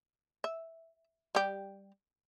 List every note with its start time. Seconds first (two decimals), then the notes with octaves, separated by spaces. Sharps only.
0.44 E5
1.35 G3 G4